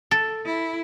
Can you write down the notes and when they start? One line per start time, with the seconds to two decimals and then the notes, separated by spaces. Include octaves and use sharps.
0.11 A4
0.45 E4